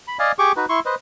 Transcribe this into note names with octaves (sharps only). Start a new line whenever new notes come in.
B5
D5 D#5 F5 G#5
G4 G#4 C#6 D6
D#4 F#4 B4
E4 C6 C#6
B4 C5 D#5